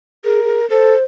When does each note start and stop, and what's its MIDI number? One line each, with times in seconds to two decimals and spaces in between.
0.24 0.43 68
0.24 0.68 70
0.44 0.60 68
0.70 0.95 69
0.70 1.04 72